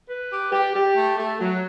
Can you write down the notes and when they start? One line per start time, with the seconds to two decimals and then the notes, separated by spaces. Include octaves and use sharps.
0.09 B4
0.31 G4
0.52 G4
0.74 G4
0.95 A3
1.18 A3
1.39 F#3